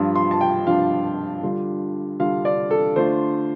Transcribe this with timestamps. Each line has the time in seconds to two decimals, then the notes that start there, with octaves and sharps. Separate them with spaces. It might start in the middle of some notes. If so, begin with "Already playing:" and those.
Already playing: G2 F3 D4 F4
0.15 C6
0.31 A5
0.41 G5
0.66 G2 F3 D4 F4 F5
1.43 D3 G3 D4 F4
2.19 D3 G3 D4 F4 F5
2.45 D5
2.71 A4
2.96 D3 A3 D4 F4 C5